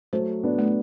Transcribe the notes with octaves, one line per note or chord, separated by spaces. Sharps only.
F#3 A3 C5
B3 D4
A3